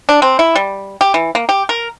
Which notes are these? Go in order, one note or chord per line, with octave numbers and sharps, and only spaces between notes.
D4
C4
E4
G3
G4
E3
A#3
G4
A#4